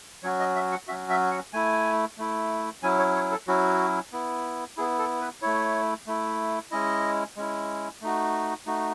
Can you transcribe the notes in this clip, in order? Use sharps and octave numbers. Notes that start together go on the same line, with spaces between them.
F#3 C#4 F#4 C#5
D#5
E5
F#5
F#3 C#4 F#4 E5
E5
F#5
A3 E4 G#5
A3 E4
F#3 C#4 E4 G#5
C#5
C#5
A4
F#3 C#4 E4 F#4
B3 E4
B3 E4 G#4
A4
B4
A3 E4 C#5
A3 E4
G#3 C#4 E4 D#5
G#3 C#4 E4
A3 D#4 F#4
A3 D#4 F#4